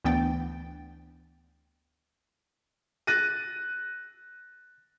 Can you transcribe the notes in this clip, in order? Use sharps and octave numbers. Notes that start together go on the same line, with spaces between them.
D2 E3 B3 D4 G5 A6
F#6 A6 A#6 D#7